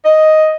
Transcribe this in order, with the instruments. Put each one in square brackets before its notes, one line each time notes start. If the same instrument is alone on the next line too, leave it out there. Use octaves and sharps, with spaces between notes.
[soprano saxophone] D#5